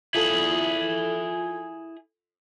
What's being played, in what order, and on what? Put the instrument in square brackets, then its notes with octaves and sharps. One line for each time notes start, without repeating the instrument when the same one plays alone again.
[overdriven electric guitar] E4 G#4 [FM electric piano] F4 A4